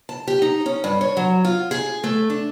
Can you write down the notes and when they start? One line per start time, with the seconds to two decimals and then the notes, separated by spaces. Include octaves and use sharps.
0.09 A5
0.27 G4
0.42 D#4
0.66 C#4
0.84 G2
1.01 C#5
1.17 F#3
1.45 F4
1.71 G#4
2.04 A3
2.30 D4